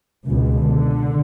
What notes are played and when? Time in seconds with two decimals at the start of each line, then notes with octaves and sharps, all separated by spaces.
0.25 C#2 B2
0.55 D3